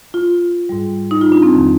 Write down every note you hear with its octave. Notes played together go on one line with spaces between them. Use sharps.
F4
G#2 G3
D#4
F4
D4
C4
F2 D#3 G3